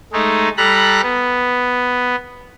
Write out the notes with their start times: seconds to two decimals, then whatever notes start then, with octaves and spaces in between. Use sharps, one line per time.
0.13 G#3 A3 D#4
0.57 G3 A4 A#5 B5 F#6
1.03 B3